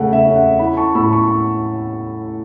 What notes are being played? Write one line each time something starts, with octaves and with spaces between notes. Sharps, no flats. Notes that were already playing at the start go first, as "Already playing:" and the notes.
Already playing: C#3 A3 F#5
E5
C#4
F#5
E4 F#5 B5
A5 C#6
A2 B5 E6
A5 C#6